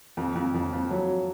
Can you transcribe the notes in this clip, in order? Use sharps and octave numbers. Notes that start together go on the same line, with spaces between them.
F2
F2
F2
F2
F#3